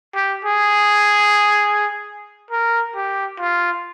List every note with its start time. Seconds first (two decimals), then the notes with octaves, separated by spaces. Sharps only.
0.15 G4
0.45 G#4
2.51 A#4
2.96 G4
3.40 F4